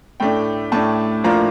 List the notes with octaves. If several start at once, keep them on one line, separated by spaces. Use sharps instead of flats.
A2 A3 D4 G5
A2 A3 D4 A5
A2 F3 A#3 D4 F4 A#5